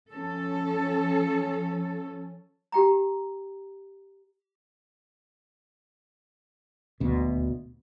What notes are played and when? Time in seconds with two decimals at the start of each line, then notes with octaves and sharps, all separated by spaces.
0.10 F3 C#4 A4
2.72 G4 G5 A#5
7.00 D#1 D2 B2